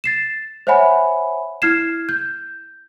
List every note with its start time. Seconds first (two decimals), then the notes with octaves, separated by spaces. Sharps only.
0.04 A6 C7 E7
0.67 C5 C#5 E5 F#5 G#5 B5
1.62 E4 F6 G#6 C7 E7
2.09 G6